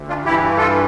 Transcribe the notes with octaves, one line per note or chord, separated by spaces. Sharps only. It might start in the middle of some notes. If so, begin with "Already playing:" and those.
Already playing: D2
D4 F4
G2 E3 E4 G4
F4 A4